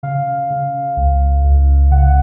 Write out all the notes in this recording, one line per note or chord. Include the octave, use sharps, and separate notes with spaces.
C#3 F5
C#3
C#2
C#2
C#3 F#5